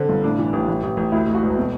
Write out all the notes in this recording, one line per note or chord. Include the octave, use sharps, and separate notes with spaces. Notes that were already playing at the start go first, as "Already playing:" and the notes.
Already playing: D3 C4
G1
A2 D4
E3
A1
A1
A1
A1
D2 E4
D2
F#4
E1
B2